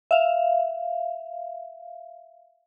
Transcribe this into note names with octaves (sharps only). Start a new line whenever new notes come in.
E5 F5